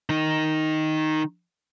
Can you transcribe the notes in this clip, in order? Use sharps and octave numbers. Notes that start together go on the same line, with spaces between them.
D#3 D#4